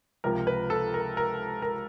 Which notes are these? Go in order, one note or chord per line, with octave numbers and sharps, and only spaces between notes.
C#2 C3 F3 A#4
B4
A4
A#4
A#4
A#4